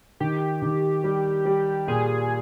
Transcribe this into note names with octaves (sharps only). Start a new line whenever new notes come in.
D#3 G4
D#3
G3
G3
A#2 G#4